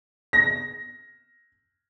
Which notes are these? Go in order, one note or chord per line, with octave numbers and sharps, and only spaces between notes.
A#6